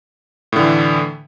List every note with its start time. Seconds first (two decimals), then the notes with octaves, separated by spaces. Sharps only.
0.52 A2
0.56 D3
0.59 E3